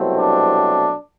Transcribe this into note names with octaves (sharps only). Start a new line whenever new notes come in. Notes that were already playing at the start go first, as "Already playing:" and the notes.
Already playing: C2 B2 F#3 A3 C4
D4